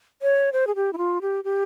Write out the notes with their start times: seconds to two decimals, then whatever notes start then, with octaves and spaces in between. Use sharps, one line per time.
0.22 C#5
0.53 C5
0.67 G#4
0.76 G4
0.93 E4
0.98 F4
1.22 G4
1.44 G4